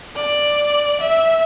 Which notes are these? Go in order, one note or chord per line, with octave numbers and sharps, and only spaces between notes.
D5
E5